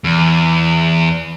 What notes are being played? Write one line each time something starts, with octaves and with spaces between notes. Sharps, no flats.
E2